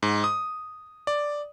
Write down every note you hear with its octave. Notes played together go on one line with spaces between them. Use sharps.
G#2
D#6
D5